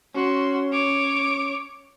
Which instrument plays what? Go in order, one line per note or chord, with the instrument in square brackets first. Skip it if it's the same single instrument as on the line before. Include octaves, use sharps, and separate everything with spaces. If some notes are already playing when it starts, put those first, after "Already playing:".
[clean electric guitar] C#4 [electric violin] F#4 C6
[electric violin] C#5 D6